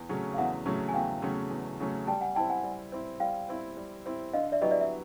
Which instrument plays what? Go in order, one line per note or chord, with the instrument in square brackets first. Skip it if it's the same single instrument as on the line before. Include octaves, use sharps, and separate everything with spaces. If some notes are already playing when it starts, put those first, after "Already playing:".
Already playing: [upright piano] E2
C#3 F#3 A3 C#4
[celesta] F5
[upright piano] E2 [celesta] E5 F#5
[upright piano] C#3 F#3 A3 C#4
[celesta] G#5
[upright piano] E2 [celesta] F5 G5
[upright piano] C#3 F#3 A3 C#4
E2
C#3 F#3 A3 C#4
[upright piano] G3 [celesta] G5 A5
[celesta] F#5 G#5
[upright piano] E4 [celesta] G5 A5
[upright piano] C4
[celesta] F#5 G#5
[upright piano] G3
C4 E4
[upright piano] G3 [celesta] F5 G5
[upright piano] C4 E4
G3
C4 E4
[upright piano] D3 [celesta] D#5 F5
[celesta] D5 E5
[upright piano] F#3 B3 E4 G4 [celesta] D#5
[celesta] D5 E5
E5